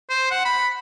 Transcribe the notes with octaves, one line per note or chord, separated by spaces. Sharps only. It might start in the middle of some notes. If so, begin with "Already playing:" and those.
C5
F#5
B5